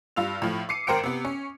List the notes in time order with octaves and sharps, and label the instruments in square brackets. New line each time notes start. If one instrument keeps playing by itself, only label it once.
[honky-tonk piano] G2 F4 E6 F7
A2 F3
D6 C7 C#7 D#7
G#1 A#4 C5 G5 C#7 D7
C3 B3
C#4